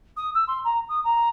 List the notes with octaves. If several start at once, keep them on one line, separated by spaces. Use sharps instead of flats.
D#6
E6
C6
A#5
D#6
A#5